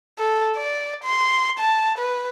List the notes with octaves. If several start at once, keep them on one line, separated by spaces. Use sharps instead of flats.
A4
D5
C6
A5
B4